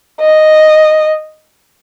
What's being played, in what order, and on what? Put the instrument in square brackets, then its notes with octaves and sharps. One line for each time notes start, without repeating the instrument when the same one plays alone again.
[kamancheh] D#5